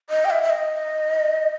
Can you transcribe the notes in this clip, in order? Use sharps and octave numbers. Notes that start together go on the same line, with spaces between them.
D#5
G5
E5
E5
D#5